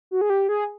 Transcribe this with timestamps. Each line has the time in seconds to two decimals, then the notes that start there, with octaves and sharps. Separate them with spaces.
0.11 F#4
0.21 G#4
0.30 G4
0.49 G#4